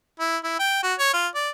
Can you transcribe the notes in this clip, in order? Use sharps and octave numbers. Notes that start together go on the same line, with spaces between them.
E4
E4
G5
F#4
C#5
F4
D5